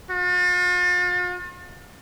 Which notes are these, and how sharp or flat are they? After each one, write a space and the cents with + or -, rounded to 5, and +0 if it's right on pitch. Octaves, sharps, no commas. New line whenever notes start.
F4 +45